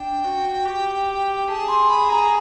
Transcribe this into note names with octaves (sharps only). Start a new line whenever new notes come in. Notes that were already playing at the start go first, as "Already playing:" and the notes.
Already playing: D4 G5
F#4
G4
G#4 A5
C6
B5
A#5